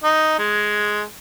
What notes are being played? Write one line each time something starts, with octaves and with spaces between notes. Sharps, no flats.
D#4
G#3